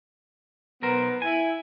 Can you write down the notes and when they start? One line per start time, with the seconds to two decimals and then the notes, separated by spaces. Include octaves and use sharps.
0.82 B1 B3 A#4 C5
1.22 E4 G#5